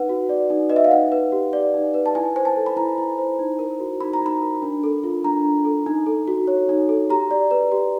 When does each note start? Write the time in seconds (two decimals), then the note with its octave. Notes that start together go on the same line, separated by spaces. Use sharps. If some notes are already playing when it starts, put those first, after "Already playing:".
Already playing: D#4 B4 F#5
0.09 F#4
0.29 D5
0.50 D#4
0.70 B4 D#5
0.76 E5
0.84 F5
0.91 D#4 F#5
1.12 B4
1.32 G4
1.53 D5
1.74 D#4
1.94 B4
2.06 A5
2.15 E4 G#5
2.36 C5 G#5
2.45 A5
2.56 A4
2.66 B5
2.76 E4 A#5
2.98 E4
3.18 C5
3.39 D#4
3.59 A#4
3.80 F#4
4.01 D#4 B5
4.13 A#5
4.21 D#4 B5
4.42 A#4
4.62 D4
4.83 A4
5.04 F4
5.24 D4 A#5
5.44 D4
5.65 A4
5.86 D#4
6.06 A4
6.28 F#4
6.47 C#5
6.69 D#4
6.89 A4
7.10 G4 A#5
7.31 D5
7.51 B4
7.72 G4